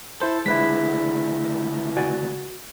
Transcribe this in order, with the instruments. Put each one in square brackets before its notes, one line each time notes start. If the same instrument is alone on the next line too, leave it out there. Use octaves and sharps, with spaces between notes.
[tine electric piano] E4 C5 [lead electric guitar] A4
[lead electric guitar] C#2 D3 [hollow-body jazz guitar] G#3 [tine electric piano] E4 B4 B6
[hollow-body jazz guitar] F#4 D5 G#5